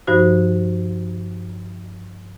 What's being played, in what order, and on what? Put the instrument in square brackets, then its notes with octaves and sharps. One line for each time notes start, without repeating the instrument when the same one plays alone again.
[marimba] G2 F3 D#4 F#4 C5